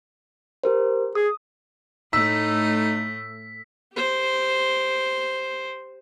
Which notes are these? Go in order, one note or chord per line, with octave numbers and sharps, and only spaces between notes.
G4 A#4 C5
G#4 D#6
A2 A3 D#4 E6 B6
G4 C5